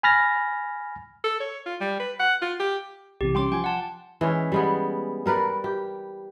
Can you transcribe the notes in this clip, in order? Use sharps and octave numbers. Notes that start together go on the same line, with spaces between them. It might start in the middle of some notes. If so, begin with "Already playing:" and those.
G#5 B5 F6 A6 A#6
A4
C#5
F4
G3
B4
F#5
F4
G4
B1 C3 E3 G4
G3 C#4 G5 C6 D6
F3 F4 G5 G#5
F#5 A5
E3 G#3 C#4
G3 G#3 B3
G3 A#4 B4 D5
G4